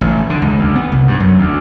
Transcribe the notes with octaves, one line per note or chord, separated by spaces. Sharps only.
A1
D3
C#2
D2
B3
C2
G2
F#2
D2